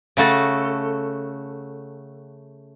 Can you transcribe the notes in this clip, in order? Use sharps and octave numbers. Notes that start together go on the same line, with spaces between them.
C#3 A3 F#4 A4